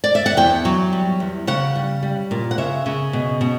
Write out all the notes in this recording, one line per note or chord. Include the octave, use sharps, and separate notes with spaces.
D5
E5
F#5
E2 G5
F#3
G3
E2
C#3 F#5
G3
G3
A#2
F#5
C#3 E5
C#3
B2
B2